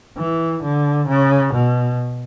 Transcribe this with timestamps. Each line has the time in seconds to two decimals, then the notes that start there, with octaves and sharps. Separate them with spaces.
0.18 E3
0.63 D3
1.08 C#3
1.54 B2